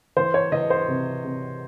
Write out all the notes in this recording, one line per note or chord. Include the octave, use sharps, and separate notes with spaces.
E3 C5
C#5
E3 D#5
C5
C3
C3